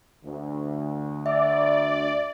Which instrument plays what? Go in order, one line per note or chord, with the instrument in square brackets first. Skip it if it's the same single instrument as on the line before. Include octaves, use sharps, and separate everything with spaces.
[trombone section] D2
[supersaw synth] D5 [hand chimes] E5